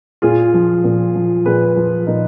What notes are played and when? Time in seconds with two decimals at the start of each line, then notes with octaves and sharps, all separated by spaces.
0.22 A#2 F4 G#4
0.54 F3
0.84 A#2
1.15 F3
1.45 A#2 G#4 B4
1.76 F3
2.07 A#2 D#4